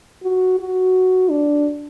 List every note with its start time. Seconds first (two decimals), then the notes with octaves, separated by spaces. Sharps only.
0.23 F#4
0.59 F#4
1.30 D4